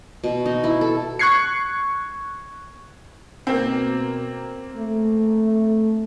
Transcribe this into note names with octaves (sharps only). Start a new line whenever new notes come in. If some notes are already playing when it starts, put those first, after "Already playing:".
B2
D#4
E4
A4
C#6 F#6 G#6 C7 C#7
B2 A#3 C4
A3